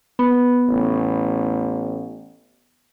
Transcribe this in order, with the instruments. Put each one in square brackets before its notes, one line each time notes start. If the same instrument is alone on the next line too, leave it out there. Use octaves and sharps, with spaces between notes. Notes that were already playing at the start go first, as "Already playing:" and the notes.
[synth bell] B3
[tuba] A1